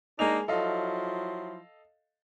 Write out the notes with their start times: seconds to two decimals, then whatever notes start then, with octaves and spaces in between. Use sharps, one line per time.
0.19 G#3 A#3 D4 D#4 G#5 F7
0.48 F3 F#3 E4 A4 D#5 F5